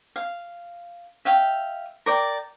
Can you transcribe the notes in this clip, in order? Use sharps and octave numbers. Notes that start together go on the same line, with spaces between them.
F5
E5 F5 G5
A#4 D5 G5